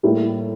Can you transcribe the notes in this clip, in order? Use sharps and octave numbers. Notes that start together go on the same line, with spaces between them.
A2 G3 A#3 E4